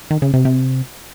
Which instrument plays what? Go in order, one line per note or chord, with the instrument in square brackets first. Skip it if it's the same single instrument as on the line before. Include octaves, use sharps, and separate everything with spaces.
[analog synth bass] D#3
C#3
C3
C3